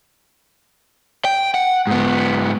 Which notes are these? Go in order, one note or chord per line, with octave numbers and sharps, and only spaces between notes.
G5
F#5
G#2 B3